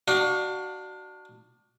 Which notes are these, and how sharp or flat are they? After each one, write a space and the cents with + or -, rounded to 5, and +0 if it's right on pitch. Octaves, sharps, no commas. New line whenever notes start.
D4 +25 F#4 +20 F5 +40